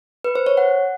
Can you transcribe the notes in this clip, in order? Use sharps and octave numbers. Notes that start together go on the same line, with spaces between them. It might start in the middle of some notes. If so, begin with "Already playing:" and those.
B4
C5
C#5
F#5